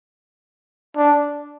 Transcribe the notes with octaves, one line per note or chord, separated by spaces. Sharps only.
D4